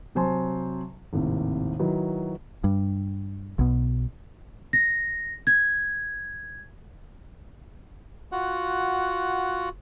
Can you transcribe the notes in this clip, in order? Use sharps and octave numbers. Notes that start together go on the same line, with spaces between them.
C3 F#3 C5 G#5 A5 C6
G#1 D#2 A2 C3
D#3 F#3 E4 F#4 B4
G2
B1 B2
A#6
G#6
F4 F#4 F#5